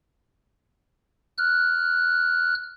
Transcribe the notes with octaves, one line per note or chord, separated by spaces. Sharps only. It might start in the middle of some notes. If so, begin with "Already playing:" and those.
F6 F#6